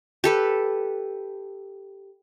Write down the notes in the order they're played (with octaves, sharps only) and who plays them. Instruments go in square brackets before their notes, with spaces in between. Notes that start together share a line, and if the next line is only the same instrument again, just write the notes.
[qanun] G4 A4 B4